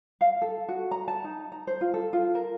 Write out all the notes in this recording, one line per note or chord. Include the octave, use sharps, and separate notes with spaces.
F5
A4
F#4
A#5
A5
D#4
A#5
C5
F4
A4
F4
A#4